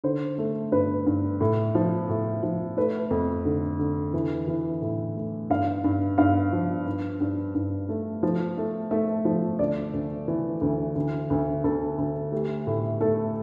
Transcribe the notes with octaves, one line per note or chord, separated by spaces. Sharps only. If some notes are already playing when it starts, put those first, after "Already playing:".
D3 C5
A3
G2 B4
G2
A2
F3
A2
F3
A3 B4
F2
D3
D3
E3
E3
A2
A3
G2 F5
G2
G2 F5
F3
G2
G2
G2
A3
F3
A3
A3 E5
F3
D2 D5
D2
E3
D2
D2
D2
D2 A4
D2
A3 G4
A2
A3 A4